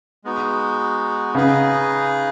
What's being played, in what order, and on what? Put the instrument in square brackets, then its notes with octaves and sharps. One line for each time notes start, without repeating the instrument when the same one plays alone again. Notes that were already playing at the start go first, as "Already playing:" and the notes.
[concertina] G#3 B3 D#4 F#4
[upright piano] C#3 [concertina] D#4 G#4 B4 D#5